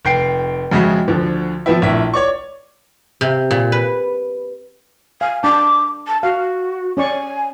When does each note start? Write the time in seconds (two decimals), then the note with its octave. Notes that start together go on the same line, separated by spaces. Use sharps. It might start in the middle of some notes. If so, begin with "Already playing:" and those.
0.05 F1 G5 C7 D7
0.71 F2 C#3 G#3 F#4 E5
1.08 D2 D3 F3
1.66 F3 B3 C4 E4
1.82 A#1 A2 E5
2.14 C#5 D5 C#6
3.21 C3
3.51 A#2
3.72 B4
5.21 F5 G#5
5.43 D4 A5 D6
6.07 A5
6.23 F#4 F5
6.97 C#4 D5 G#5 C#6